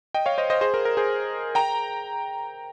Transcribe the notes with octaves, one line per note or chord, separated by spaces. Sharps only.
D#5 G5
C#5 F5
C5 D#5
C5 D#5
G#4 C5
A#4
A#4
G#4 C5
G5 A#5